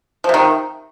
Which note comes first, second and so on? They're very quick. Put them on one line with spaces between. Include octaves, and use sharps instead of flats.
F3 C3 D#3